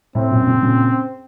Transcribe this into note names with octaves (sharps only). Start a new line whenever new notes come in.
A2 C4
F#2 A#2
A#2 C#3
A#2 C#3